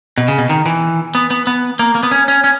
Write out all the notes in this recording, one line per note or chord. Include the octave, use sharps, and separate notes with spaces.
B2
C#3
B2
D#3
E3
B3
B3
B3
A#3
A#3
B3
C#4
C#4
C#4